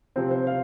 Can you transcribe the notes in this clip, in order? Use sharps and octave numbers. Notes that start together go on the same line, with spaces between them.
C3 F3 C4 C5
C5
F5